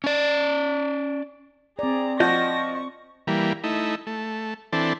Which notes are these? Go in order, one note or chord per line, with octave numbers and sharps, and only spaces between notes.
C#4 D5
C4 G#4 D5 A#5
F3 F#4 D#5 C#6 G6 A#6
C#6
E3 G3 A#3
A3 D#4 E4
A3
E3 C4 D4 A4